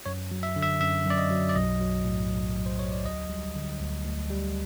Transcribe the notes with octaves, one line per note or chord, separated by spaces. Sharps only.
F#2 C#5
F#3
E5
D3
E5
F#2 E5
F#2
D5
D#5
F#3
D5
B1 D#5
F#3
A2
B1
B1
C5
F#3 C#5
D5
D2 D#5
G3
D3
D2
D2
G3